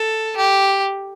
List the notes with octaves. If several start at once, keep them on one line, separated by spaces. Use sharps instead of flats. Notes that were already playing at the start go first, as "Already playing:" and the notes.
Already playing: A4
G4